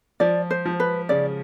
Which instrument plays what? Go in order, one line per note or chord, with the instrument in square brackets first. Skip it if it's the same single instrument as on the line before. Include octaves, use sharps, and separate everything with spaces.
[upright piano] F3 [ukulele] D5
[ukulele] C5
[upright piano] F3
[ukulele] B4
[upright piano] C#3 [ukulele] D5